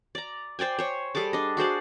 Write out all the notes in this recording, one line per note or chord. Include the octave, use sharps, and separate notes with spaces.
D5 A#5
C5 D5 G5 G#5
C5 C#5
G3 G#4 A4 D6
D4 D#5
F#4 G#4 C5 D5